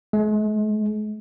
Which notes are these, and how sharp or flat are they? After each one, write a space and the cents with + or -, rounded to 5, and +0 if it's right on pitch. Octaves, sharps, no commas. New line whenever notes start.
G#3 +45